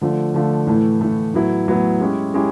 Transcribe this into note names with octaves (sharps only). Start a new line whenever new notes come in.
D3 F3 A3
D3 F3 A3
A2 E3 A3
A2 E3 A3
A2 F#3 B3 E4
A2 F#3 B3 E4
G#3 C#4 E4 G4
G#3 C#4 E4 G4